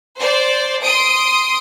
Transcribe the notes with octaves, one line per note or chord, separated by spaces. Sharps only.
C5 D5
C6 D#6 D7